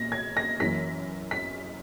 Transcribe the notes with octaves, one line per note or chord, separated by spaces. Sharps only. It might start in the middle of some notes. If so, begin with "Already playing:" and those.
Already playing: A#2 A#6
G#6
A#6
F#2 E3 A#3 B6
B6